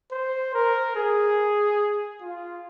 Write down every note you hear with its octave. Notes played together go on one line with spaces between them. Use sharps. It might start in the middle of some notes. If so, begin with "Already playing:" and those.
C5
A#4
G#4
F4